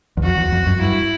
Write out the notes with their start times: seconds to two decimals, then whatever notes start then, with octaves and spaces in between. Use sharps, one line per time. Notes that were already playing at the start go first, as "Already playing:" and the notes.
0.17 E2
0.23 F2 F#4
0.38 E2
0.52 F2
0.66 F#2
0.81 G2 E4